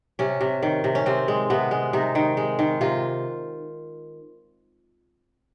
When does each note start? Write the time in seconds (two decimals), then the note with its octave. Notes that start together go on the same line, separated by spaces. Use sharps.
0.19 C3 C#4
0.41 C3
0.63 D#3
0.84 C3
0.95 C#4
1.06 C3 C4
1.28 G#3
1.50 C3 B3
1.71 G#3
1.93 C3 D#4
2.15 D#3
2.37 G#3
2.59 D#3
2.81 C3 F4